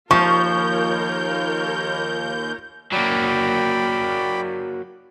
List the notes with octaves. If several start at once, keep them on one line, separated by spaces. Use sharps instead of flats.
D#2 F3 F4 A#4 C#5 C#6 G6
F#3 A#3 D5 G5 B5